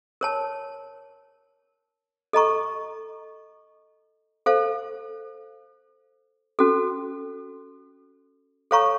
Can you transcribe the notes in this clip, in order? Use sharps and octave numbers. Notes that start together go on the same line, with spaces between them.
A#4 C#5 A5
A4 D#5 A#5 C#6
A4 C5 F5
C#4 F#4 A4
A4 C#5 F5 A#5 C#6